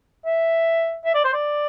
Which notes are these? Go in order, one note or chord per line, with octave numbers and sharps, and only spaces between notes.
E5
E5
D5
C5
D5